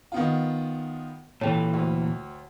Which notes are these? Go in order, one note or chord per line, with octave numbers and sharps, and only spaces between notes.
D#3 B3 F4
A#2 E3 A4 C#5 G5
D2